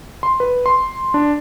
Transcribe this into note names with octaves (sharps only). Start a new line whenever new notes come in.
C6
B4
C6
D4